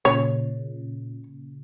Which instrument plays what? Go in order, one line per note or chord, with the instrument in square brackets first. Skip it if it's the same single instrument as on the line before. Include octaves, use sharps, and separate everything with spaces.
[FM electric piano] A#2 C#3 [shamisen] C#5